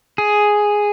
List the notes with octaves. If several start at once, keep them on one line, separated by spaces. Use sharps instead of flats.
G#4